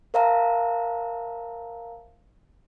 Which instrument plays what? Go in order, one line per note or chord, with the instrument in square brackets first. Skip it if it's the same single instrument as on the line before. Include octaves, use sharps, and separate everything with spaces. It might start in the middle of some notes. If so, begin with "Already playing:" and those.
[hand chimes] A#4 C5 E5 F5 A5 A#5